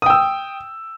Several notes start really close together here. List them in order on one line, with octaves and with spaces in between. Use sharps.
D#6 G5 E6